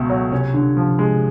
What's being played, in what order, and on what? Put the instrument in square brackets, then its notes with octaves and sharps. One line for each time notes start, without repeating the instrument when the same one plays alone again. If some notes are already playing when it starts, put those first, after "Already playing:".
Already playing: [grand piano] C#2 B2 A3
F#3
[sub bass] C3 [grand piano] C#4
[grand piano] D3
F3
G#3